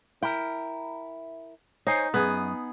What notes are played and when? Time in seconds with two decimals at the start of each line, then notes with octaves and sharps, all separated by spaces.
0.23 E4 A#4 G5
1.87 D#4 C5 C#5 G#5
2.14 F#2 B3 G#4